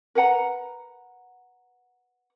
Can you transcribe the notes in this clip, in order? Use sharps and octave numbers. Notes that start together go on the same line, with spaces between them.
A#4 B4 F#5 A#5